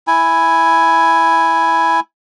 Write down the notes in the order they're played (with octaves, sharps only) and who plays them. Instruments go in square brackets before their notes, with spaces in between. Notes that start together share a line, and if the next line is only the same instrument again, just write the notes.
[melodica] E4 G#5